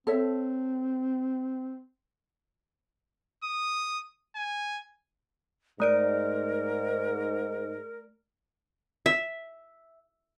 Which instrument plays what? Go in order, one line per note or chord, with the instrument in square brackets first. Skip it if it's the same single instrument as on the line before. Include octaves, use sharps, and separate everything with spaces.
[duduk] C4 [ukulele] A4 C#5 E5
[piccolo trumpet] D#6
G#5
[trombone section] G#2 [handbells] A3 D5 D7 [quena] A#4
[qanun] E5